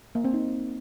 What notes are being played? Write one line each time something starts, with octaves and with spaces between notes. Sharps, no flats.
A#3
C4
D#4